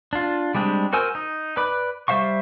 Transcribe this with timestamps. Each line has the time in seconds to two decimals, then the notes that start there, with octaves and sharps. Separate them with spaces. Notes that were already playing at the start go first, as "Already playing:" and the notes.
0.13 D4 F4
0.55 G3 G#3 C4 D4
0.93 F#4 A#4 C5 G#5 E6
1.15 D#4
1.57 B4 D5 B5
2.08 G3 C5 E5 F5 C#6